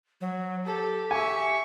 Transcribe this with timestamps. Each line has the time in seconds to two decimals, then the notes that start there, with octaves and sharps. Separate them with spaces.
0.21 F#3
0.66 G4 A4
1.11 E5 G#5 C#6